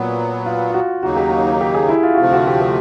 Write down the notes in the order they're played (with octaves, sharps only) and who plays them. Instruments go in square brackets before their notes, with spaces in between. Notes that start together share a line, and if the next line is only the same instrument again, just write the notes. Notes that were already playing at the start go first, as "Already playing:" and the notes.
Already playing: [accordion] A#2 F#3 B3
[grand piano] F4
F4
F#4
[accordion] D#2 C#3 F#3 A#3 D#4 [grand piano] F#4
[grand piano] G4
F#4
G4
G#4
E4
F4
F#4
[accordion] D2 C3 F3 A3 C4 [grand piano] F4
[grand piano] F#4
G4
G4